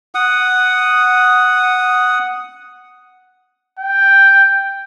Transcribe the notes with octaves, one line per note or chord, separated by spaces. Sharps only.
F#5 D#6
G5